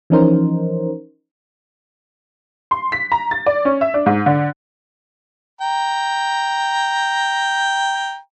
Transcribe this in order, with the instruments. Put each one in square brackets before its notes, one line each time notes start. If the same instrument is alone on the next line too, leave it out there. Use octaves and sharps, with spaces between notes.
[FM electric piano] E3 F3 C#4 D#4 A#4 C5
[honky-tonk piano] C6
B6
A#5
A6
D5
C#4
E5
D4
G#2
D3
[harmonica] G5 A#5